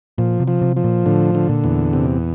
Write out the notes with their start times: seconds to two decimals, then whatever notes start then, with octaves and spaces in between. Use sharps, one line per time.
0.18 A#2 F3
0.40 C3
0.48 F3
0.62 C3
0.77 F3
0.84 A#2
1.06 A2 D3
1.35 D3
1.49 A#2
1.64 E2
1.93 C3